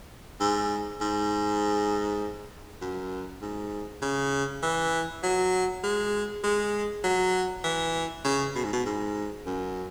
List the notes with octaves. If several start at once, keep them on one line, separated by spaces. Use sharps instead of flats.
G#2
G#2
F#2
G#2
C#3
E3
F#3
G#3
G#3
F#3
E3
C#3
B2
G#2
B2
G#2
F#2